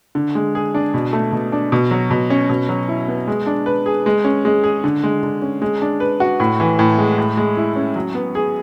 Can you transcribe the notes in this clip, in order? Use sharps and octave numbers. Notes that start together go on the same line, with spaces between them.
D3
G#3
G#4
D4
B2
A3
B2
D4
B2
F#3
B2
C#4
B2
F#3
E4
B3
G#3
D4
B4
G#4
G#3
C#4
G#3
G#4
D3
G#3
D3
C#4
G#3
D4
B4
F#4
A2
E3
A2
G#3
A2
G#3
E4
C#4
F#3
B3
G#4